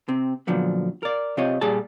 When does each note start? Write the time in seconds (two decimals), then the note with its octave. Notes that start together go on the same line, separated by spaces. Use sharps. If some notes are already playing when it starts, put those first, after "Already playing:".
0.08 C3 C4
0.47 A#2 D3 F3 F#3 B3
1.03 A#4 D5
1.37 C3 C4 F4 G4 C#5 D#5
1.61 A#2 G3 G#4 A5